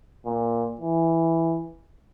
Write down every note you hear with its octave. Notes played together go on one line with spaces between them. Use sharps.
A#2
E3